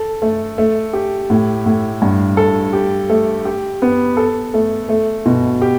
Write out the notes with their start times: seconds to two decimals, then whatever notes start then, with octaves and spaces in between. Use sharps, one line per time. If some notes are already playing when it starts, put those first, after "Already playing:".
Already playing: A4
0.22 A3
0.58 A3
0.93 G4
1.30 A2
1.66 A2
2.02 G2
2.37 A4
2.73 G4
3.10 A3
3.45 G4
3.82 B3
4.17 A4
4.54 A3
4.89 A3
5.26 B2
5.62 G4